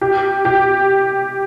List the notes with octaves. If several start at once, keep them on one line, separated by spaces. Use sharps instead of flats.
G4
G4